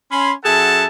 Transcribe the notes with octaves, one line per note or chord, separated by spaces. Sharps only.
C#4 B5 C6
F#2 G#4 A4 E5 F#5 A5